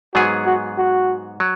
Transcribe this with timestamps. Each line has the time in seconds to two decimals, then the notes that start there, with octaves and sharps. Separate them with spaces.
0.14 G#2 F#3 B3 F#4 G#4
0.46 F#4
0.78 F#4
1.40 F#3